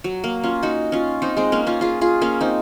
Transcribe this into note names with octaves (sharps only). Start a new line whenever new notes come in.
F#3
A#3
C#4 F4
D#4 F#4
C#4 F4
C4 D#4
G#3 C4
A#3 C#4
C#4 F4
F4 G#4
F4 G#4
A#3 C#4
C4 D#4